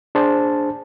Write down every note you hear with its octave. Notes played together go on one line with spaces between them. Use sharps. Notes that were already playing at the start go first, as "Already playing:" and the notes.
D4 G#4 C5 A5